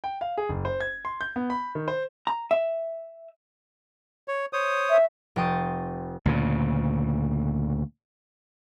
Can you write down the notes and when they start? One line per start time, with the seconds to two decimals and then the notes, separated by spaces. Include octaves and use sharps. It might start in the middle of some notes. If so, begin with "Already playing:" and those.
0.04 G5
0.21 F5
0.37 G#4
0.49 F#1
0.65 C5
0.80 G#6
1.05 C6
1.21 G6
1.36 B3
1.50 B5
1.75 D#3
1.88 C5
2.27 A#5
2.51 E5
4.28 C#5
4.53 C5 C#5 D#6
4.90 E5
5.36 F1 C5 G5 C#6 D#6 A6
6.26 D2 A#2 C#3